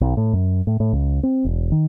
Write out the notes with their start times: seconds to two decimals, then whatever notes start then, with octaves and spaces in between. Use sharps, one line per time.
0.01 B1
0.17 A2
0.33 F#2
0.67 A2
0.80 A2
0.93 C#2
1.23 C4
1.45 E1
1.72 D#3